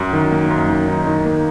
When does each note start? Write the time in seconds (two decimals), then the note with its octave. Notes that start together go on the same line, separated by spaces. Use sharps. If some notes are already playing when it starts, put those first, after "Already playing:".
Already playing: F#2
0.13 D#3
0.32 A#3
0.50 F#2
0.69 D#3
0.88 D#4
1.07 D#3
1.25 A#3